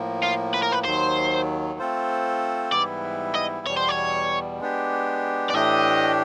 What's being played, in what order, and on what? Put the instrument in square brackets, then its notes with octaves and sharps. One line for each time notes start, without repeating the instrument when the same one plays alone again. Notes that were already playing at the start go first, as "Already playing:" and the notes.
Already playing: [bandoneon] A2 F3 A#3
[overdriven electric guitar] F4
B4
A#4
B4
[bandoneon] D#2 D#3 F#3 [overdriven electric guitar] C5
[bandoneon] A3 C4 F4 A4 C5
[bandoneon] G#2 E3 G3 B3 E4 [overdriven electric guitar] D5
[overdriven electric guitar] D#5
[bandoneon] E2 B2 G3 [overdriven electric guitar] C#5
[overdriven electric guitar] C5
C#5
[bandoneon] G#3 B3 D4 G4
[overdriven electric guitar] D5
[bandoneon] A2 E3 A3 D4 G4 [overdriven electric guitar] D#5